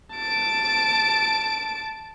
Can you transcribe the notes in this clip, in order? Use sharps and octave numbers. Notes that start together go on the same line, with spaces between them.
A5 D7